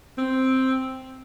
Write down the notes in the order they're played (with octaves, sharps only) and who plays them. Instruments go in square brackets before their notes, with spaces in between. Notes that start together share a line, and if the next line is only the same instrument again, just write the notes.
[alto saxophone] C4